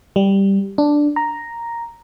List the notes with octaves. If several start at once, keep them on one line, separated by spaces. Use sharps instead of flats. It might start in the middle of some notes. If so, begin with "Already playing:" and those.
G3
D4
A#5